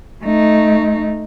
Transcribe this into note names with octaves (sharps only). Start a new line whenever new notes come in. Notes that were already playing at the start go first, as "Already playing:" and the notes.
A3 D#4